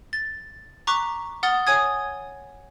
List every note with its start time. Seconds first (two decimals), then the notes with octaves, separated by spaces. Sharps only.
0.13 A6
0.87 A#5 C#6 D6 F#6 B6
1.43 F#5 D#6 F6 A6 G7
1.67 C#5 G#5 D#6 G#6